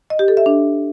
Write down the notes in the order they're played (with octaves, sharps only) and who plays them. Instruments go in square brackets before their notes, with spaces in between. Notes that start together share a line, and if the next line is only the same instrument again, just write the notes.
[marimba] D#5
G4
A4
E5
D4